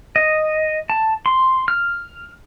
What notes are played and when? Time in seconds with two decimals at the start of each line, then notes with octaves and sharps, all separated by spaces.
0.16 D#5
0.90 A5
1.26 C6
1.68 F6